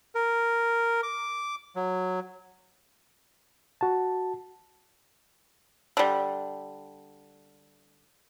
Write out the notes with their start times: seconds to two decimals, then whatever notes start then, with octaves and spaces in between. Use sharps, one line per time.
0.15 A#4
1.03 D6
1.76 F#3
3.81 F#4 A5
5.97 D3 G3